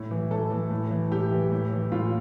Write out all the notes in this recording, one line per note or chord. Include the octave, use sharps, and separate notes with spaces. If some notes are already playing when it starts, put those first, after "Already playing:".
Already playing: A2 E5
E3
A2 A4
E3
A2
E3
A2 G4
E3
A2
E3
A2 F4